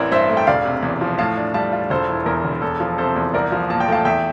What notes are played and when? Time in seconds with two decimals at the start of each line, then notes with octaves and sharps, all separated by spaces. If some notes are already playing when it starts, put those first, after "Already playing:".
Already playing: A1 E3 C4 A#4 D5
0.12 G2 C5 E5
0.30 A3
0.37 G5
0.47 E1 D5 F5
0.65 C3
0.83 E2
1.01 F3
1.18 A2 F5 A5
1.37 D4
1.54 G3 F5 A5
1.73 F4
1.90 E1 A4 C5
2.09 E3
2.26 E2 A#4
2.45 E1
2.62 E2 A4
2.80 F3
2.98 C3 A4 C5
3.16 E2
3.34 C2 A#4 D5
3.52 F3
3.70 A#2 A5
3.80 G5
3.88 A3 F5 A5
4.05 E2 E5 G5